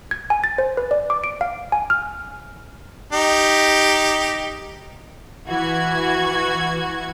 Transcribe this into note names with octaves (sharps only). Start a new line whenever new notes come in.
G#6
G#5
A6
C5
B4
D5
D6
D7
F5
G#5
F6
D#4 G4
E3 F#4 G#6